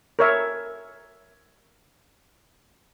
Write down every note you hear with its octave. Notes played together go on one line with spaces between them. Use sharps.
A#4 C#5 E5